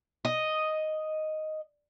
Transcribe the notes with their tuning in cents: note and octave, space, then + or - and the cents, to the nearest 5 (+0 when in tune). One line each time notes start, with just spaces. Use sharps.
D#5 +0